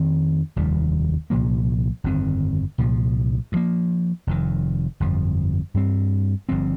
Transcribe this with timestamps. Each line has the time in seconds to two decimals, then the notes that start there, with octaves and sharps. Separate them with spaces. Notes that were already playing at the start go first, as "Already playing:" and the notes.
Already playing: F2 D#3 C4
0.56 F1 D#2 D#3 G3
1.30 C2 A#2 F3 A#3
2.04 G1 F2 D#3 C4
2.78 C2 A#2 F3
3.52 G2 F3 A#3
4.27 F1 F2 D#3
5.00 G1 F2 F3
5.74 G2 G3 C4
6.49 G1 G2 F3 C4